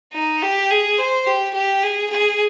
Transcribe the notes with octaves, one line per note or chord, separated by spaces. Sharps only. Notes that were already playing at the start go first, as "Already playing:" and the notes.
D#4
G4
G#4
C5
G4
G4
G#4
G#4